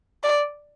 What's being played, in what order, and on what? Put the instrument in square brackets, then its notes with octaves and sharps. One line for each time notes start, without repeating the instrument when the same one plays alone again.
[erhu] D5